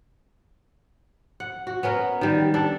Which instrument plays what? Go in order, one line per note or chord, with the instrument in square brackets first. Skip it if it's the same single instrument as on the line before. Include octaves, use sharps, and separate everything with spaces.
[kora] F#5
F#4
B3 C#4 A#4
D#3 G3
D4 A4